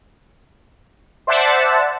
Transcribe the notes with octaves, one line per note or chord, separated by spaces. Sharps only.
C5 D5 E5 F#5 A5